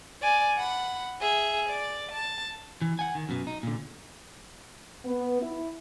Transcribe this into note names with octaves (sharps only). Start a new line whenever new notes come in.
D5 G#5
F#5 B5
G#4 E5
D5
A5
E3
F#5 G#5
D#3
F#2 B2
D#4
A#2 D3
B3
E4